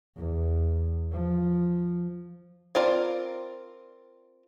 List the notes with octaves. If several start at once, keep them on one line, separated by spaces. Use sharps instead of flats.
E2
F3
C4 F4 A#4 D5